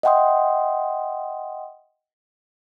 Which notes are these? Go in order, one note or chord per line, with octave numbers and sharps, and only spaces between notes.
D#5 E5 F#5 G5 C6 D#6